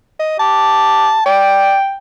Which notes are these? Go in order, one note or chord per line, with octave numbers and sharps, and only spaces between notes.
D#5
G4 A5
D5 G5